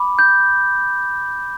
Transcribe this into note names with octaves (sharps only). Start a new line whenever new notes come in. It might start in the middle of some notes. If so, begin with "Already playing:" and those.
Already playing: B5 D6
G6